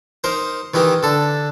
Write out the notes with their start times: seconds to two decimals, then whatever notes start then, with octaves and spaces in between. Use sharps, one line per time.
0.24 D#4 A#4 C5
0.74 D#3 E3 D#4 G4
1.03 D3 A4